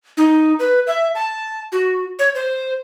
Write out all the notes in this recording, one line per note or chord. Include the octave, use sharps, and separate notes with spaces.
D#4
B4
E5
A5
F#4
C#5
C5